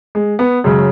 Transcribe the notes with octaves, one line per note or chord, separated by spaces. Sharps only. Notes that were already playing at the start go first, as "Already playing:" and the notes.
G#3
B3
F#2 C#3 G#3